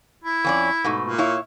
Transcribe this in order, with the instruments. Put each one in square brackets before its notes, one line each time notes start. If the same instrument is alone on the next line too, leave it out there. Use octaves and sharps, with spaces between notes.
[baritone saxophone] E4
[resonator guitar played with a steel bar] F2 C#4 D5
G#2 B2 A3
[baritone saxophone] A#2
[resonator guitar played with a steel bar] E4 C#5 F5